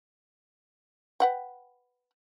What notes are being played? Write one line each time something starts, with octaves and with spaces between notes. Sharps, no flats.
B4 F#5 G5